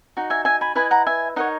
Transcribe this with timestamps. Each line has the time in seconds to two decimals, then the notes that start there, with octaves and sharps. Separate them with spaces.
0.17 D#4 F#4
0.30 E5 G#5
0.45 E5 G#5
0.61 G#5 B5
0.75 E4 B4 D#5 G#5 B5
0.91 F#5 A#5
1.07 E5 G#5
1.36 D#4 A#4 C#5 D#5 F#5